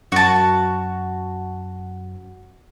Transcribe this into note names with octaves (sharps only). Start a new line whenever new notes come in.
F#2 F#4 A5